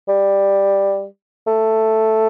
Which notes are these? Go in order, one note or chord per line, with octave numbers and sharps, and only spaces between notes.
G3
A3